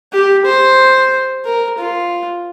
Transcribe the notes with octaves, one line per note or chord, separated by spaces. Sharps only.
G4
C5
A#4
F4